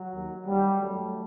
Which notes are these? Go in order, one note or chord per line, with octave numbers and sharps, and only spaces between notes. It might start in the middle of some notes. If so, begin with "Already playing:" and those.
Already playing: F#3
D#2 D#3
D#2 D#3 G3
F#2 D#3 F#3 A3